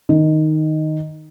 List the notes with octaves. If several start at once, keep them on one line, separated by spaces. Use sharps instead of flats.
D#3